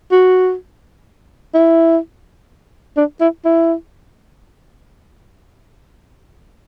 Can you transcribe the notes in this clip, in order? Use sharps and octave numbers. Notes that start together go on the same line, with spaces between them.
F#4
E4
D4
E4
E4